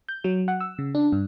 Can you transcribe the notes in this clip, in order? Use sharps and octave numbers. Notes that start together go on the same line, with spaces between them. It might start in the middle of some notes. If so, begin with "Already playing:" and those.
G6
F#3
F#5
E6
C#3
D4
G2